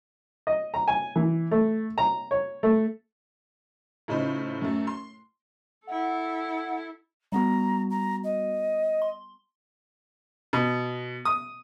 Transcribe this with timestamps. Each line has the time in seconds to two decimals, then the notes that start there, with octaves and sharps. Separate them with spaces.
0.47 D#5
0.74 A#5
0.88 G#5
1.16 E3
1.51 A3
1.98 A#5
2.31 C#5
2.63 A3
4.08 A2 C#3 D#4 F4 C5 B5
4.62 F#2 A3
4.87 C6
5.87 E4 A4 F#5
7.32 G3 B3 F#4 A#5
7.90 A#5
8.24 D#5
9.02 C6
10.53 B2
11.25 D#6